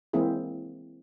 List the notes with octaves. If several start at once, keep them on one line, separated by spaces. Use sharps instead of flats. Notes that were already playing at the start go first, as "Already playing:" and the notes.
E3 G#3 A#3 C4 E4 G#4